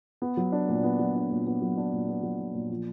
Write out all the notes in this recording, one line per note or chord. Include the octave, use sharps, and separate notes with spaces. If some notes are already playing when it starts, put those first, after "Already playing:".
B3
F#3
D4
A#2
B3
F#3
D4
A#2
B3
F#3
D4
A#2
B3
F#3
D4
A#2
F3